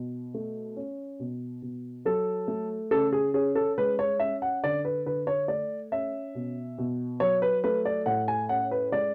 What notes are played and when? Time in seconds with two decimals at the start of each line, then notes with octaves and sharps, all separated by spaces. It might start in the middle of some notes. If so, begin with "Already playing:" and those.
Already playing: B2
0.34 A3
0.77 C#4
1.20 B2
1.62 B2
2.05 F#3 A4
2.48 A3
2.91 C#3 A4
3.13 G#4
3.34 C#4 G#4
3.55 A4
3.78 G#3 B4
3.99 C#5
4.20 C#4 E5
4.42 F#5
4.63 D3 D5
4.85 B4
5.06 D3 B4
5.27 C#5
5.48 A3 D5
5.92 C#4 E5
6.35 B2
6.78 B2
7.20 F#3 C#5
7.42 B4
7.64 A3 B4
7.85 D5
8.06 A2 F#5
8.28 G#5
8.49 C#4 F#5
8.71 B4
8.92 G#3 D5